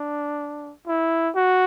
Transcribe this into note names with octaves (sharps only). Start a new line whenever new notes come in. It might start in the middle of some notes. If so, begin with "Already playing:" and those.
Already playing: D4
E4
F#4